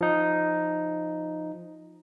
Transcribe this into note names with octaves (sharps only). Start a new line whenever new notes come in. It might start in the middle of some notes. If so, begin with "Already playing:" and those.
F3 D#4